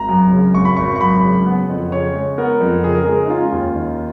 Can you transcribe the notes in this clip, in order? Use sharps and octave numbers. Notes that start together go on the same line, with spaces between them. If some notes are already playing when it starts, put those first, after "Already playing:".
Already playing: G#1 A#5
F#2
C#3
G#1 C#6
B5
G#1 C#6
C#6
F#2 B5
C#3
B3
F2
C#3 C#5
G#3
B3 A#4
F2
C#3 G#4
A#4
G#3 G#4
D#4
C#4 F4
D#2
D#3